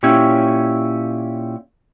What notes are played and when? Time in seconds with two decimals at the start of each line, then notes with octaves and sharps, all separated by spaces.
0.03 A#2 C#4 E4 G4 C#5